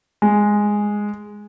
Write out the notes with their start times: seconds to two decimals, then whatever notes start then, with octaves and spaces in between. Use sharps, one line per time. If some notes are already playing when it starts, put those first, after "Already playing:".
0.22 G#3